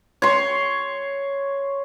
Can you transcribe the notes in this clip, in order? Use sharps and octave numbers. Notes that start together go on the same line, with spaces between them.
C#5 C6